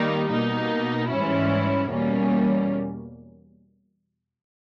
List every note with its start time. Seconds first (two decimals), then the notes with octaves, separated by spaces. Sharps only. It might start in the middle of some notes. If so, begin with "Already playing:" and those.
Already playing: D#3 G3 A#3 D#4
0.30 B2 A#3 D#4
1.10 G#2 E3 G3 C#4 E4
1.90 E2 B2 G3 A#3 C#4